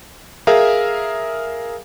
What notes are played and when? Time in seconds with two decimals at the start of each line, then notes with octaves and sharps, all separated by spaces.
0.47 G#4 A#4 E5 F5